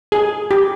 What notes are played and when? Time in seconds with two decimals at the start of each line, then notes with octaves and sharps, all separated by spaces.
0.12 G#4
0.51 G4